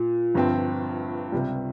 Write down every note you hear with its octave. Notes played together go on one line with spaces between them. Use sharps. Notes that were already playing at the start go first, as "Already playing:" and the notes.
Already playing: A#2
G1 G2 F3 C4
C#2 C3 G3